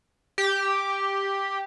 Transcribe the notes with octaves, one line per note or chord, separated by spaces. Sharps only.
G4